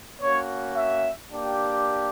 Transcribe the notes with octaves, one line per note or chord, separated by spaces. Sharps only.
A#3 C#4 F#4 C#5
E5
A#3 D4 G4